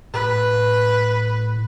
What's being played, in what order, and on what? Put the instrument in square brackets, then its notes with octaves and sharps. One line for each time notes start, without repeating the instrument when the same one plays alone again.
[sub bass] A2 [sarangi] B4